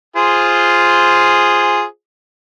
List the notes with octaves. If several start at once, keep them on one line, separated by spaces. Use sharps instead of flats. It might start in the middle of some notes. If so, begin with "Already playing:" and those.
F4 G#4 C5